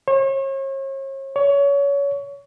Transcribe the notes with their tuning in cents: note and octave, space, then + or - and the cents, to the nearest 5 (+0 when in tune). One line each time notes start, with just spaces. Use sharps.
C#5 -40
C#5 +25